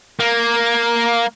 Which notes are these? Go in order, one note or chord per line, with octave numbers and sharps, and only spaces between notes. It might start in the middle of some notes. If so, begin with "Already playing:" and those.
A#3